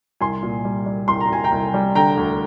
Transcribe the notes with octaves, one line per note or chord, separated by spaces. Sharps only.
C2 G#5 C6
A#2
G3
G3
C2 C6
A#5
C2 G#5
G5 A#5
C2
G3
D3 G5 A#5
D2